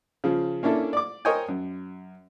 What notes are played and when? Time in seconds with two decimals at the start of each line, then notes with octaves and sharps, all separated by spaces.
0.24 C#3 F3
0.63 A#3 C#4 D4 E4 A4
0.93 D5 D6
1.25 A#4 C5 C#5 D#5 G5 G#5
1.49 F#2